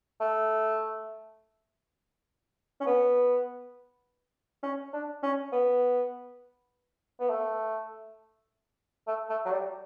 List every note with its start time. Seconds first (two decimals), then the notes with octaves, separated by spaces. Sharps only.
0.20 A3
2.80 C#4
2.86 B3
4.63 C#4
4.93 D4
5.23 C#4
5.52 B3
7.20 B3
7.30 A3
9.07 A3
9.29 A3
9.45 F#3
9.51 G3